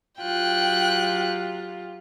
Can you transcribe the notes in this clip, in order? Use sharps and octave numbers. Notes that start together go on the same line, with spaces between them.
F#3 F4 G4 G5 F#6